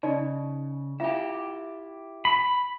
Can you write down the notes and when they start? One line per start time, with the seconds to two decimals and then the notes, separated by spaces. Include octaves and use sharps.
0.03 C#3 D#4 D5 D#5
1.00 E4 F4 G4 E5 F5
2.25 B5